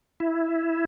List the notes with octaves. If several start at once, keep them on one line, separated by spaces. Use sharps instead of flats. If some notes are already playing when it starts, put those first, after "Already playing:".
E4